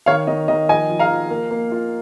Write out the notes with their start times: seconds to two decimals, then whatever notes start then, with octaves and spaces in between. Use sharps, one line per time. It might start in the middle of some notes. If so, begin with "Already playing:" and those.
0.06 D#3 C#5 F5
0.27 D#3 D#5
0.48 D#3 D#5
0.68 F3 D#5 G#5
0.89 F3
0.99 F5 A#5
1.10 F3
1.30 A#3
1.51 A#3
1.72 F4